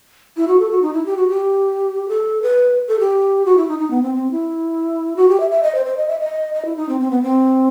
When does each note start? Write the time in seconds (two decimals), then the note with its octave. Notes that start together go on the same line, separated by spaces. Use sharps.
0.37 E4
0.48 F#4
0.59 A4
0.71 F#4
0.82 D#4
0.93 E4
1.06 G4
1.17 F#4
1.28 G4
2.08 A4
2.42 B4
2.88 A4
2.99 G4
3.46 F#4
3.57 E4
3.68 D#4
3.79 D#4
3.90 B3
4.02 C4
4.14 C4
4.31 E4
5.17 F#4
5.29 G4
5.40 E5
5.51 E5
5.63 D#5
5.75 C5
5.85 C5
5.97 D#5
6.08 E5
6.19 D#5
6.54 D#5
6.65 E4
6.76 D#4
6.89 C4
7.00 C4
7.11 B3
7.23 C4